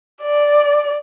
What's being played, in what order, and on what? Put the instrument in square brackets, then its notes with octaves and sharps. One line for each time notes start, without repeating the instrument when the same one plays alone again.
[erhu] D5